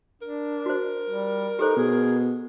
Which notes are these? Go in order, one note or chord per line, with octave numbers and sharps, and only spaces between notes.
D4 A#4
F#4 C5
G3
D#4 G4 A4 C5
B2 G#4